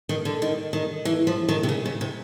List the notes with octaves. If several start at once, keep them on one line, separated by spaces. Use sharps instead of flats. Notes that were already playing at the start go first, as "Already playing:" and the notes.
D#3
D3
D#3
D#3
E3
F3
D#3
C3
C#3
C#3
C3